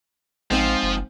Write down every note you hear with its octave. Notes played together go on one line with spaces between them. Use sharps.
A1 G#2 F3 C4
F#1